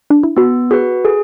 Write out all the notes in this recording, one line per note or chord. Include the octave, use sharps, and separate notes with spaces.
D4
E4
B3 F#4
F#4 G#4 B4
G#4 A4